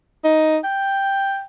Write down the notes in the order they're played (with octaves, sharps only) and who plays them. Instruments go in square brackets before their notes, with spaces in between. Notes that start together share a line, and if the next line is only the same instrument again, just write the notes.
[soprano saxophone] D#4
G5